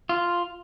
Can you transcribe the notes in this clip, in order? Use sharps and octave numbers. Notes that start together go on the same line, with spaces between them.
F4